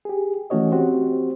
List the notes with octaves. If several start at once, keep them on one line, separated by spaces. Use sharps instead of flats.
G4 G#4
E3 A3 C#4 F#4 C#5 D#5
C4 F#4 G4 C5